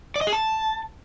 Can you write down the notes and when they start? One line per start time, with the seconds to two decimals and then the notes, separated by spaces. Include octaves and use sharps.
0.16 D5
0.21 D#5
0.27 G#4
0.33 A5